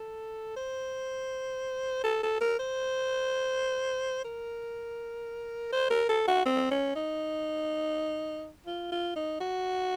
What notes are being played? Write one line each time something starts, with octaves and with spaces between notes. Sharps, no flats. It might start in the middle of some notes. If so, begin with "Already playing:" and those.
Already playing: A4
C5
A4
A4
A#4
C5
A#4
C5
A#4
A4
F#4
C4
C#4
D#4
F4
F4
D#4
F#4